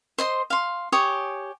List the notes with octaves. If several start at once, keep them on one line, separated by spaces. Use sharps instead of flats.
C5 D#5 C6
F5 C6
G4 C#5 G#5 D#6